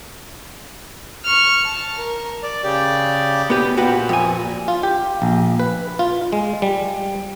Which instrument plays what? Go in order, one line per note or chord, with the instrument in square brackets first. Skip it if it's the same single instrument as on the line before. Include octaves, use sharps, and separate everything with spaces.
[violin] C#6 F6
A5
A#4
[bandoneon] D5
C#3 G4 D5
[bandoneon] B2 [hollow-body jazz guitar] B3 G4 B4
[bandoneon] A#2 [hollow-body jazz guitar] F#4 G4 B4
[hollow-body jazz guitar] F2 G#5
[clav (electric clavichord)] F4
G4
A#1
B4
F4
G#3
G3